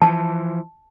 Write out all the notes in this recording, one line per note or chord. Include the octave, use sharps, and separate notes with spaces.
E3 F3 A5